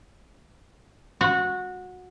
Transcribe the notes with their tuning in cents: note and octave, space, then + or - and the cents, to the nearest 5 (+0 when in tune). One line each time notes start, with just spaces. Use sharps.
F#4 -20